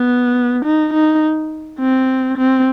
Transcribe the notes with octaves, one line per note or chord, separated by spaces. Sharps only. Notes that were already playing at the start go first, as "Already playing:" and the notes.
Already playing: B3
D#4
D#4
C4
C4